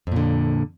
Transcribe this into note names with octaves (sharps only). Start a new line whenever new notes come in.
F2 A#2 D3